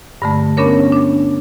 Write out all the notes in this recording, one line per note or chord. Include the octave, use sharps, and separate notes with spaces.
G2 D3 A3
B3 C#4 D4 A#4 C#5
D4